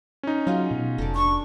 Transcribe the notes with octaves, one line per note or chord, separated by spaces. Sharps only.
C#4 D#4
F#3 F4 F#4 G#4
B2
F1 A4 D5
D4 C#6